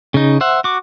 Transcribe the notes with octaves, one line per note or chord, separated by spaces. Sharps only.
C#3 D#4
C5 E5 F#5
F#4 D6